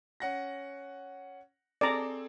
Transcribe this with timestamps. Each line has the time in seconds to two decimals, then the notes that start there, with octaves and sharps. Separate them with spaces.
0.20 C#4 F#5 A#6
1.81 C4 G#4 A4 D5 A#5